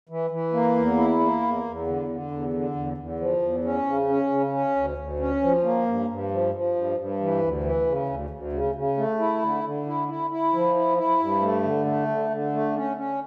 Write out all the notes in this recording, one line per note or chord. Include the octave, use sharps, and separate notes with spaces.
E3
E3
A#3
E2
E4
A#3
E2
E2
D3
D3
E2
D3
E2
E2
F3
E2
C#4
C#3
C#4
C#3
C#4
D2
D2
C#4
F3
A#3
G2
G2
F3
F3
G2
G2
E3
D2
E3
C#3
D2
D2
C#3
C#3
A3
E4
D3
D3
E4
E4
E4
F3
E4
E4
G2
A3
D3
A3
D3
D3
A3
C#4
C#4